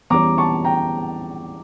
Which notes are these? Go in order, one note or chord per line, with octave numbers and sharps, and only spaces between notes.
E2 E3 G3 C#4 A#5 D6
A5 C#6
G5 A#5